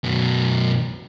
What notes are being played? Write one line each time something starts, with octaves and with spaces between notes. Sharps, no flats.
F#2 B2